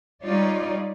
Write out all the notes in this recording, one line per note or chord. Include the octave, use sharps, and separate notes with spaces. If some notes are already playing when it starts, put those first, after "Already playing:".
G3 D#4 F4 C#5 D5